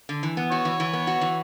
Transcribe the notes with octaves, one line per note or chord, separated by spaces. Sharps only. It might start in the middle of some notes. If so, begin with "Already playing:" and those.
D3
E3
B3
F#4 C#5
E3
E3
B3
F#4
E3